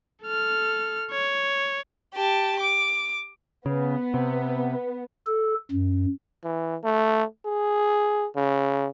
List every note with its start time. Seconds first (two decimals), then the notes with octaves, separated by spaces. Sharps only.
0.23 A4 F6
1.11 C#5
2.14 G4 A5
2.60 D6
3.66 C#3 B3
4.14 C3
5.27 A4
5.71 F#2
6.44 E3
6.84 A3
7.46 G#4
8.36 C#3